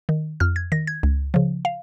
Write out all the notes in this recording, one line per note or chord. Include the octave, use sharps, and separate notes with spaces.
D#3
F2 F6
G#6
D#3 A#6
G#6
C#2
C#3 F3
F5